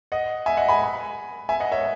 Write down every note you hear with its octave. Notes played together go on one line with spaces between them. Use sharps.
D#5 F#5
E5 G#5
D#5 F#5
G#5 B5
E5 G#5
D#5 F#5
C#5 E5